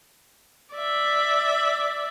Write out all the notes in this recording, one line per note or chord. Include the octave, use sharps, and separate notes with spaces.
D5 E5